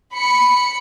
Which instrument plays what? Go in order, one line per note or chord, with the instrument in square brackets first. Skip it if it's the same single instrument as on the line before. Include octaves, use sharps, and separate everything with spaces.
[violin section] B5 C#7